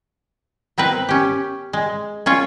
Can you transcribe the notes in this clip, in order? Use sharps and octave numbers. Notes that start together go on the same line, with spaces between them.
B3 C4 A#4 B4
C#4 G4
G#3
C#4 F4 C#5